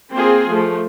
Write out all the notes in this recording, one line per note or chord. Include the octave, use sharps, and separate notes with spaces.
A#3 C4 F4 G#4
F3 A3